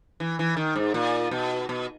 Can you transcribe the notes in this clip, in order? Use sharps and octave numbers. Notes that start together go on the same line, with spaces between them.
E3
E3
D#3
G#2
A#2
B2
B2